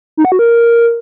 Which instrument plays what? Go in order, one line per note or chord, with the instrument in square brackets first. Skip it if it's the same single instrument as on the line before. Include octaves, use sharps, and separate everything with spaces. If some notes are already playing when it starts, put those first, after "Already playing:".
[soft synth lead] D#4
F#5
F#4
A#4